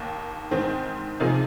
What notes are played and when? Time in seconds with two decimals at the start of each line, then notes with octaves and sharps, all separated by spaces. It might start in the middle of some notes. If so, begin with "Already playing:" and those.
Already playing: D#2 D#3 A#3
0.51 G#2 D#3 C4
1.20 C3 F3 A#3 D#4 G#4